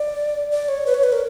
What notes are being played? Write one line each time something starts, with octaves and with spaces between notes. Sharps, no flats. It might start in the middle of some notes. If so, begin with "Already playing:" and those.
Already playing: D5
D5
C#5
B4
C#5
B4
A#4